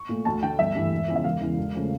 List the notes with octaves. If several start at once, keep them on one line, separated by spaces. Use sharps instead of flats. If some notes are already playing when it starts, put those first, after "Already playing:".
Already playing: C#6
A#2 A3
D2 A5
D3 A3 G5
G1 E5
G2 E3 A3
E1
E2 C#3 F3
E5
E1 F5
E2 C#3 E3
E1
C#3 F3 A3